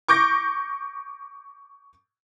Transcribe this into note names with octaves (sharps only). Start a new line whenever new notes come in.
C#6 D6 G6 A#6